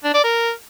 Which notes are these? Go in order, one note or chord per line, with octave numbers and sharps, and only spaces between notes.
D4
D5
A#4